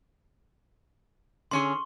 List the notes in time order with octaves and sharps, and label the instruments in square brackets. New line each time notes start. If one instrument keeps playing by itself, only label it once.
[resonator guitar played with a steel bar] D3 C#4 G#4 [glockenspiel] C6 C#6